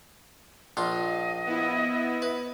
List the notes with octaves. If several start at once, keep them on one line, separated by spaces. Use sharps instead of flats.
A#1 F4 D#5
B3 E4
B4